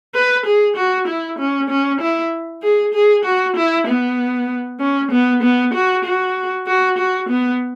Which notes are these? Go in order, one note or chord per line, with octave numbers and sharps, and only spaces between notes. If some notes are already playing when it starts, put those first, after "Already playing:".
B4
G#4
F#4
E4
C#4
C#4
E4
G#4
G#4
F#4
E4
B3
C#4
B3
B3
F#4
F#4
F#4
F#4
B3